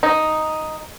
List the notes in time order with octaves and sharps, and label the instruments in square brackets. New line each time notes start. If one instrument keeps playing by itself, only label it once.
[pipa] D#4